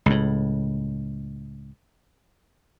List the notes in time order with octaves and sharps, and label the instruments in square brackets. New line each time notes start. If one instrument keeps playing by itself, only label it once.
[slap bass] C#2 A2